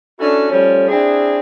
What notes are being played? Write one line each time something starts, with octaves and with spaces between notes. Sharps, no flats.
C#4 D4 E4 F#4 A4
F3 G3 A3 C#4 F4
C4 D4 E4 G#4